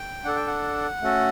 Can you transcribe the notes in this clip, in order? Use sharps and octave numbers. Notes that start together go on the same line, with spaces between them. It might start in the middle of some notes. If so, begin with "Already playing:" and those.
Already playing: G5
D4 A4 F#5
G5
F#5
A3 C#4 F#4 A4